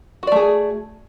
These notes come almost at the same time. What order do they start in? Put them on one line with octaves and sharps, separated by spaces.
F#4 D5 A3 G#4